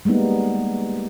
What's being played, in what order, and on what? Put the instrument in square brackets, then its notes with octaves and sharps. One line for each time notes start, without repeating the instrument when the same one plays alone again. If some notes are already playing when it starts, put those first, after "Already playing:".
[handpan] G3 G#3 A#3 B3 D#4